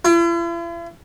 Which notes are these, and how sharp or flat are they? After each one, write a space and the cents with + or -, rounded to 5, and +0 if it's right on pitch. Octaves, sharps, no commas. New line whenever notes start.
E4 +45